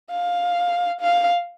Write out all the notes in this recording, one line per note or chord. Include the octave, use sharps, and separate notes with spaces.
F5
F5